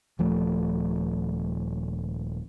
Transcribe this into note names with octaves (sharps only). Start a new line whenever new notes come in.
D#1 F3 A3